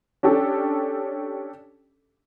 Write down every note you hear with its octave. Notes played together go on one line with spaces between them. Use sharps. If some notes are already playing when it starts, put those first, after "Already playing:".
C#4 D4 G4 A4